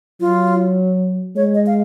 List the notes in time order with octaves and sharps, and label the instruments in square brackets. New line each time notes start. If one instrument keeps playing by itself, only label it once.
[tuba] F#3 [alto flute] F4
[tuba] G#3 [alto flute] C#5
[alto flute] D#5
F5